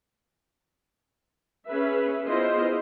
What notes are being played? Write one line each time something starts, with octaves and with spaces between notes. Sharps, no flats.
C#4 G#4 B4 E5
B3 E4 F4 G#4 C5 D#5